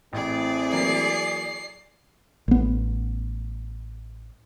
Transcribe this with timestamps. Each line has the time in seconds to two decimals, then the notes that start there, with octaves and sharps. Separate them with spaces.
0.13 A1 A3 C4 E4 G#4 D5
0.72 E3 F#3 A#3 C7
2.48 A1 B3